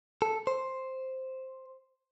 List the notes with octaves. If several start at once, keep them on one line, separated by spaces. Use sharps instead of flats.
A4
C5